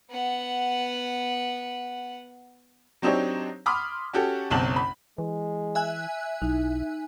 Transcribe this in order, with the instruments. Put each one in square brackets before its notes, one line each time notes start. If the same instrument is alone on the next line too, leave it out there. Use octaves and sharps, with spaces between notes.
[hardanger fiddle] B3 F#5
[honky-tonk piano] F#3 C4 D4 D#4 G4 C#5
B5 C6 D6 D#6 F6 B6
C#4 F#4 G4 A4
F#1 B1 C4 A5 F#7
B5
[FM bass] E3 [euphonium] G#3
[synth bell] E5 G#5 F#6
[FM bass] B1 [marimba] D#4 [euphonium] E4